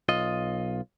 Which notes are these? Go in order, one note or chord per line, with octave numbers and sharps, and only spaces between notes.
B1 F4 D#5